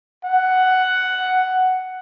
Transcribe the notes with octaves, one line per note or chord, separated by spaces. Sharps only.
F#5